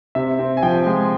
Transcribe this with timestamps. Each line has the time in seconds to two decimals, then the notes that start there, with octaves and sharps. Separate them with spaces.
0.15 C3 E5
0.39 C4
0.57 G#5
0.63 F3 G5
0.86 G#3